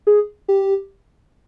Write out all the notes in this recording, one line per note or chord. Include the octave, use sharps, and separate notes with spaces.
G#4
G4